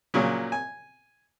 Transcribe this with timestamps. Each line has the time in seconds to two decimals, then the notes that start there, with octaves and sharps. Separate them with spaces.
0.14 A#2 C#3 F#3
0.52 G#5